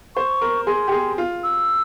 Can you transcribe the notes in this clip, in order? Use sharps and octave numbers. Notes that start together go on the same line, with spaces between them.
C5 C#6
A#4
G#4 C6
G4
G#4
F4
E6